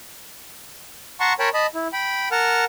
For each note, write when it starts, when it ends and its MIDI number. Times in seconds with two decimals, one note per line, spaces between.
1.20 1.33 78
1.20 1.33 81
1.20 1.33 82
1.20 1.33 84
1.20 1.33 85
1.39 1.49 70
1.39 1.49 73
1.39 1.49 79
1.39 1.49 81
1.39 1.49 83
1.54 1.67 75
1.54 1.67 81
1.54 1.67 83
1.74 1.88 64
1.93 2.29 79
1.93 2.29 83
2.32 2.65 70
2.32 2.65 78
2.32 2.65 81
2.32 2.65 89